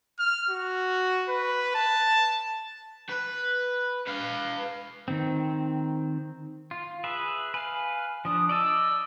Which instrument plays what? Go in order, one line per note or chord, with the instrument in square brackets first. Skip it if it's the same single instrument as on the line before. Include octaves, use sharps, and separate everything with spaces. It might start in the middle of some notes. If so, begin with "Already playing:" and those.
[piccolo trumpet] F6
F#4
B4
A5
[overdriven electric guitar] B4
B4 F5
[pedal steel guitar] D#3 C4
F4
G#4 B4 E5
[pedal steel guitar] B4 F5 [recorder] G#5
[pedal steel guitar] F3 D4 [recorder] D#6
[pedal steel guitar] D5 D#5 A5 [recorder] E6